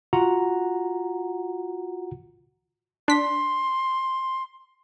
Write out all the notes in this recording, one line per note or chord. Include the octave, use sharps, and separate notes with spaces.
F4 F#4 F#5 A#5
D4 C6 B6